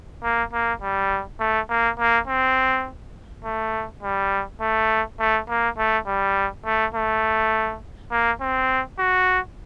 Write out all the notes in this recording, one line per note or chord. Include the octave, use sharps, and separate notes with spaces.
A#3
A#3
G3
A3
A#3
A#3
C4
A3
G3
A3
A3
A#3
A3
G3
A3
A3
A#3
C4
F#4